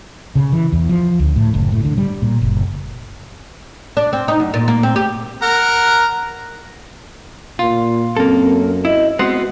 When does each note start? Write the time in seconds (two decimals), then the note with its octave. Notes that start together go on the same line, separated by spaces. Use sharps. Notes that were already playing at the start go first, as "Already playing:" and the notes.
0.35 C#3
0.52 E3
0.72 E2
0.89 F3
1.19 D2
1.36 A2
1.54 F#1
1.72 A2
1.85 D3
1.98 G3
2.22 A#2
2.41 F#1
3.97 D4
4.13 C4
4.28 D#4
4.40 F#2
4.54 A#2
4.68 A#3
4.83 C4
4.96 G4
5.42 A#4 F#5 A#5
7.59 A#2 F4
8.17 F#2 A#3 C4 A4
8.85 E4 D#5
9.19 G#3 B3 C4 F#4 F#5